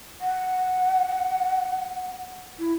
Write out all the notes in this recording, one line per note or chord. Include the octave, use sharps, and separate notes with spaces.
F#5
E4